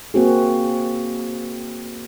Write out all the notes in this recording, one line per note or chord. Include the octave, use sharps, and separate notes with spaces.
A#3 C4 F#4 G#4